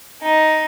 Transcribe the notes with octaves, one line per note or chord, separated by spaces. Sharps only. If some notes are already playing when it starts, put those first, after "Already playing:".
D#4